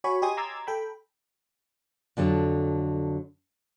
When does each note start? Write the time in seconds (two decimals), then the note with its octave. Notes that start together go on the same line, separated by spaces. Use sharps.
0.04 F#4 C#5 G#5 B5 C#6
0.22 G4 D#5 G#5 C6 D#6 G#6
0.37 A#5 C6 D6 E6 G#6 A6
0.67 A4 G5 B5
2.17 F2 D3 F#3 A4